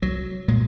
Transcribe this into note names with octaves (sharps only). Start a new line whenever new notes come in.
C2 F#3
A#2 G#3